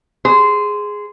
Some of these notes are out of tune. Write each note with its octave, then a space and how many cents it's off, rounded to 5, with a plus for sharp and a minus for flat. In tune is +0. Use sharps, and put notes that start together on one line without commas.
G#4 +0 C5 -15